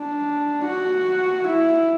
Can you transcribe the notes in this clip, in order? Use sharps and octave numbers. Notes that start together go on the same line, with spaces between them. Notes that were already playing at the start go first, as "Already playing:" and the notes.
Already playing: D4
F#4
E4